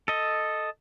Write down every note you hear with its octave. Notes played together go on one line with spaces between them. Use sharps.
A4 D#5